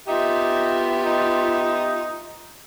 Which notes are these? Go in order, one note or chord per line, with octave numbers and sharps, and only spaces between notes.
B3 D#4 F4 G4 E5
D#4